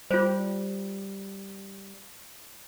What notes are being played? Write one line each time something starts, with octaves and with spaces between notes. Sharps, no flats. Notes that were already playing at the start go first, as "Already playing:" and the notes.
G3 F4 C5